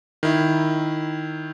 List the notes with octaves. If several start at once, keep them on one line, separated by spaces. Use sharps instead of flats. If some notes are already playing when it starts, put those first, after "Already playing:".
D#3 E4